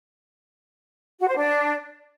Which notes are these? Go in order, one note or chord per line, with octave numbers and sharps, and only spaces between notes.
F#4
C5
D4